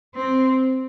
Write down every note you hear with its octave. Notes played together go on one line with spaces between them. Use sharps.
C4